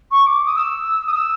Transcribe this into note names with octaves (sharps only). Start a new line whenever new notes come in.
C#6
D6
D#6
E6
D#6
E6